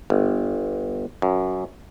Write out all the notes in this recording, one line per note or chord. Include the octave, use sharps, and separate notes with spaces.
G1
F#2